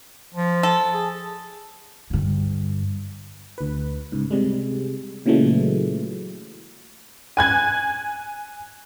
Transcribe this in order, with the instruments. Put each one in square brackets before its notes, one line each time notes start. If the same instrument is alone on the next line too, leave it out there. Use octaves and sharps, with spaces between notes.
[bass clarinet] F3
[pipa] A4
[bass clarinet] G#4
[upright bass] G2 D3
[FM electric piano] D2 B4
C#2 G#2
C3 G3 G#3
A#2 C#3 E3 F#3 G#3 A3
[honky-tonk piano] G#5 F#6 G#6